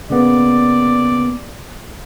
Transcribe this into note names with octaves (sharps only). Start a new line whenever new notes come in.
C#3 A#3 B3 D5